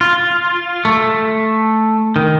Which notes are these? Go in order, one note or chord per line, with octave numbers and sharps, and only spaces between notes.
F4
A3
D#3